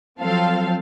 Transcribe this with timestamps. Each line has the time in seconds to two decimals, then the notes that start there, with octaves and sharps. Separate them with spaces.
0.20 F3 F#3 C4 F4 A4 F5